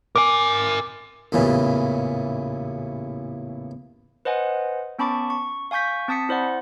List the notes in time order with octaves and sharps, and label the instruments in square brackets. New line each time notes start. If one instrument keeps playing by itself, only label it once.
[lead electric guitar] A#4 G#5 [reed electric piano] D6
[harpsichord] A1 E2 A#2 C#3 E3
[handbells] B4 C5 D#5 F#5 G#5
B3 C#4 A5 B5 C#6 D6
C#6
F5 G#5 C#6 G6 B6
C4 A5 D#6 B6 C#7
E4 C5 D5 F#5